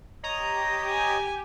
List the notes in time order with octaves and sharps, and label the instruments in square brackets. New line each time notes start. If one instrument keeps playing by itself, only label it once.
[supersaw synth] G4 [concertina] C#5 D#5 D#6 [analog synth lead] A#5
[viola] G#5